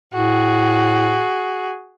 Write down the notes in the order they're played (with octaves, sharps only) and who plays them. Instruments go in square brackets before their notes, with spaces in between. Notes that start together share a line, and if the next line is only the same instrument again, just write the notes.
[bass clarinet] A2 [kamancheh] F#4 G#4